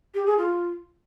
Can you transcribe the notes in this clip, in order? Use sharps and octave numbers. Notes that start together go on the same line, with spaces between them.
G4
G#4
F4